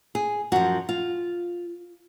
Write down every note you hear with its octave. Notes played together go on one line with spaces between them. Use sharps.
G#4
F#2 F3 F#4
F4